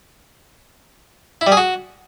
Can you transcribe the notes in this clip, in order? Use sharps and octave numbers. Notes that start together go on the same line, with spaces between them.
E4
G3
G#4
F#4